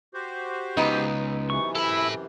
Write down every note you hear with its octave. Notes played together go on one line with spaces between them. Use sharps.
F#4 G4 C5
C#2 B3 D#4
F#2 C3 E3 C#6
E4 A4 B5